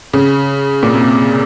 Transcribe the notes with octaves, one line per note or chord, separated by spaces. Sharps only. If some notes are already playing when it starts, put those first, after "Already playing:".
C#3
A#2
C3